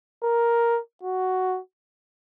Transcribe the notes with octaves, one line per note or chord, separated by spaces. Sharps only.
A#4
F#4